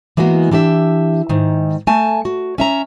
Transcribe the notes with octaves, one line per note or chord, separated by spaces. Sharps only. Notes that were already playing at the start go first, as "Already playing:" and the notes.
E3 G#3 A#3 B3 F#4
E3 D4 G4 E5
G#2 D#3
A3 G#5 A5
F#4
C#4 E5 A#5